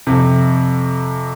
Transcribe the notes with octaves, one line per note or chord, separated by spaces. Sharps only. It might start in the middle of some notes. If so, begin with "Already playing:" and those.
F2 C3